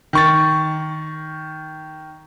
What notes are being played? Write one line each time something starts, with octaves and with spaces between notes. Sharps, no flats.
D#3 C#6 A6